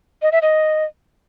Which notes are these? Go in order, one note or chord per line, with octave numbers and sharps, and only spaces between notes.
D#5
E5
D#5